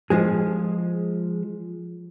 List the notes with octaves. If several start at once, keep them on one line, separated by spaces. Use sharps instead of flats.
F3 G#3 G#4